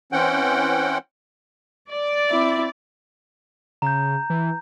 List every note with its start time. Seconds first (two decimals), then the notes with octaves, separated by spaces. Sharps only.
0.12 E3 C4 C#4 F#5 G5
1.90 D5
2.30 C4 E4
3.82 C#3 A#5 G6
4.30 E3